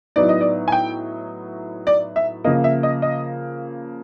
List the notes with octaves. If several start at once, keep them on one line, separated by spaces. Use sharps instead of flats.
A2 F#3 B3 D#4 D5
D#5
D5
G#5
G5
D5
E5
C#3 F3 A#3 D#5
E5
D#5
D#5